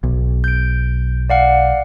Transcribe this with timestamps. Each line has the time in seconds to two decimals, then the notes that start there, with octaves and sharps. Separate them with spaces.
0.03 B1
0.44 G6 D7
1.30 D5 F5 F#5